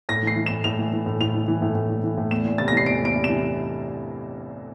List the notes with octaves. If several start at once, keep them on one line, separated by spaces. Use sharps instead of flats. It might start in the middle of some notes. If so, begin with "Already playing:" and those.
A2 A#6
E3
C7
E3
A2 E7
A2 F7
E3
E3
A2
A2 F7
E3
E3
A2
A2
E3
E3
A2
E2 E7
E2
C3 A6
A#6
E3 C7
E2 D7
E2 D7
C3
E3 E7